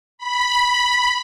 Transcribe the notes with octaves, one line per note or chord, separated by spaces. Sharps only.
B5